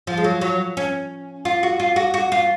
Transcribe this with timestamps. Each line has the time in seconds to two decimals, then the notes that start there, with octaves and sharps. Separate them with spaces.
0.07 F3
0.17 G#3
0.24 F#3
0.41 F#3
0.77 C#4
1.45 F4
1.63 F#4
1.80 F4
1.96 F#4
2.14 F#4
2.32 F4